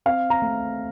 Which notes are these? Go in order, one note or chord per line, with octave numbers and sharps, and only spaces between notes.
C4 F5
A#5
A3